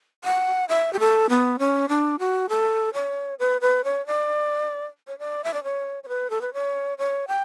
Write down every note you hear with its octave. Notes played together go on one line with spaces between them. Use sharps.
F#5
E5
G4
A4
B3
C#4
D4
F#4
A4
C#5
B4
B4
C#5
D5
C#5
D5
E5
D5
C#5
C#5
B4
A4
B4
C#5
C#5
G5